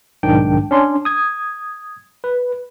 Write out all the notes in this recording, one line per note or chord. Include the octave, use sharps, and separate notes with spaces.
B1 G#2 D#3 D4 G5
C#4 D4 C6
D#6 G#6
B4